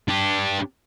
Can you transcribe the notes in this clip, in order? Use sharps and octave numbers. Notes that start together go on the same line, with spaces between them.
D4 G4